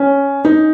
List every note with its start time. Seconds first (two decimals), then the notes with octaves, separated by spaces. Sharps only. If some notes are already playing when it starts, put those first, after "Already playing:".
Already playing: C#4
0.45 D#4